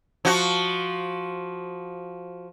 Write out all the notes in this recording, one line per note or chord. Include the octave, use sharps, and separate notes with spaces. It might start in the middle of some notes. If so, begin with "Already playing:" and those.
F3 F#4